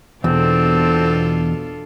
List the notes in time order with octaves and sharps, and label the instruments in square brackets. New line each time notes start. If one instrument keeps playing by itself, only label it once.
[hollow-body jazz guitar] E2 [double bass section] B2 [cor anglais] C4 [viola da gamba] D4 F4 A4